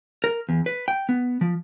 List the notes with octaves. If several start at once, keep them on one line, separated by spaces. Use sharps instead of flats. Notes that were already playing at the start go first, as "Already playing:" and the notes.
A#4
E2
B4
G5
B3
F3